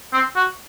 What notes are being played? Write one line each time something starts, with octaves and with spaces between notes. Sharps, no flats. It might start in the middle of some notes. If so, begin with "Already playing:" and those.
C4
F#4